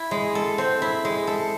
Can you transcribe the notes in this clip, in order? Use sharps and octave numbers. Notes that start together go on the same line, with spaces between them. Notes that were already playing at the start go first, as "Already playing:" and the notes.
Already playing: E4
G#3
A4
C4
E4
G#3
A4